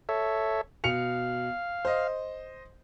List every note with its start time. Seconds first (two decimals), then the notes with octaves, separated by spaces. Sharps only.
0.09 A4 C#5 E5
0.84 B2 F5 C#7 F7
1.85 C5 D#5